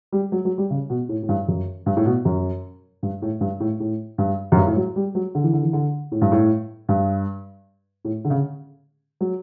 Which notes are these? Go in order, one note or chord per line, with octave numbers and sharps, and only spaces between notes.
G3
F#3
F#3
G3
C#3
B2
A2
A2
G2
F#2
G2
A2
B2
F#2
G2
A2
G2
A2
A2
G2
F#2
G2
A2
F#3
G3
F#3
D3
E3
D3
E3
D3
A2
G2
A2
G2
A2
D3
C#3
F#3